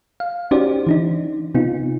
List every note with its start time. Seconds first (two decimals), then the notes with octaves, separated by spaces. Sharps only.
0.20 F5
0.51 C#4 D#4 F#4 G4 C5 D5
0.87 E3 D4 D#4
1.55 C3 B3 D#4 F4